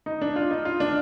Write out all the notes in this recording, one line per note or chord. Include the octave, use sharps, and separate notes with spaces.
D#4
D4
F4
D#4
F4
D4